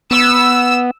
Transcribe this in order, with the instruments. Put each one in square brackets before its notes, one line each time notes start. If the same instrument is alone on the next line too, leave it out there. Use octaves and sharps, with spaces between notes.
[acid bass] B3 [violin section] E6